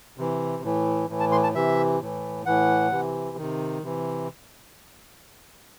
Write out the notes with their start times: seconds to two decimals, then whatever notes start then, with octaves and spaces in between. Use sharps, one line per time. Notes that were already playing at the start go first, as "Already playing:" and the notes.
0.18 C3 E3
0.63 A2 E3
1.09 A2 E3
1.20 A5
1.32 C6
1.43 A5
1.54 C3 E3 E5
2.01 A2 E3
2.46 A2 E3 F#5
2.91 C3 E3
3.37 C3 D#3
3.83 C3 E3